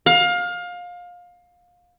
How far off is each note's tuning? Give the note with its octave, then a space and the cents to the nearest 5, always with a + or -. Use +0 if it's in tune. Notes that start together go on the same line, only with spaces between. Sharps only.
F5 +25